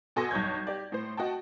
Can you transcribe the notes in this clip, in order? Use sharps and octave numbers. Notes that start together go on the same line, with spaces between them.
B2 A4 G#5 C6 A#6
B1 G2 C#5 G6 G#6
G4 D5
A2 C5
F#4 D#5 G5 A5